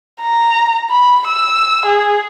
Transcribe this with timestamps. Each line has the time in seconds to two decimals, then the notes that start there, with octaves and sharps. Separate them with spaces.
0.22 A#5
0.90 B5
1.28 E6
1.86 G#4